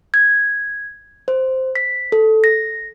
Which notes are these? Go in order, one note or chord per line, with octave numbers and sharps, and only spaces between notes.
G#6
C5
B6
A4
A#6